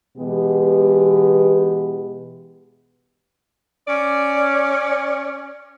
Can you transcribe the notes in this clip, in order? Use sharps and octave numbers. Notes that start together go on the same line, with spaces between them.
B2 E3 G#3 B3 G4
C#4 D5